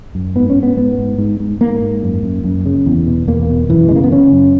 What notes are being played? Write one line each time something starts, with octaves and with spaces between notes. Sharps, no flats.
F#2
G#2 B3
C#4
G#2
B3
G#2 B3
G#2
G#2
G#2
G#2 A#3
G#2
F#2
F#2
F#2
C#3
E2
B2
E2 A#3
B2
F#2 E3
G#3
C#3 A#3
B3
C#3 C#4
F#2